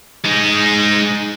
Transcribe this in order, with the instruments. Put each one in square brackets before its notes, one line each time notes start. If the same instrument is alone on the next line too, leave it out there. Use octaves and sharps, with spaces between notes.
[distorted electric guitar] G#3 D#4